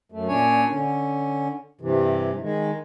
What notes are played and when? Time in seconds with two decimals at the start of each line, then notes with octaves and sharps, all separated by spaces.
0.12 F#2 A3
0.28 A#2 C#4 D4 C#5 G#5
0.70 D3 C#4
1.81 G2 C3 E3
2.42 D#3 G#3